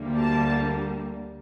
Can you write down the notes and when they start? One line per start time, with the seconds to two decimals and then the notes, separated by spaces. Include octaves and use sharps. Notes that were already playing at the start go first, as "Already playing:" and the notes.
Already playing: D2 D3 G3 A#3
0.19 A5